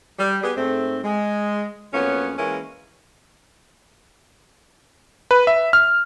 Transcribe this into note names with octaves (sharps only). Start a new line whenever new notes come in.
G3
B3 G4 G#4
G#2 A3 C4
G#3
F2 F#3 A#3 B3 C#4 C#5
E3 G#3 A#3 C#4 E4 A#4
B4
E5
F6